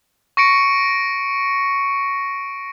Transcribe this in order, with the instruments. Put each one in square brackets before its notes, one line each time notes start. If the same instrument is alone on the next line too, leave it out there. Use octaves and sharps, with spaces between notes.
[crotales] C#6 A#6 C#7 D7